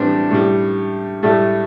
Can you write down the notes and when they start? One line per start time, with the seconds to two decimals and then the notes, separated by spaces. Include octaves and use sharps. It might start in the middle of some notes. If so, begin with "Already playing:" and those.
Already playing: A2 E3 G3 C4 D4
0.31 A2 G3
1.23 A2 G3 A3